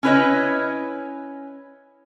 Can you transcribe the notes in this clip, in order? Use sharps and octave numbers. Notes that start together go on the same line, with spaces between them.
C#4 D4 E4 B4 C#5 D#5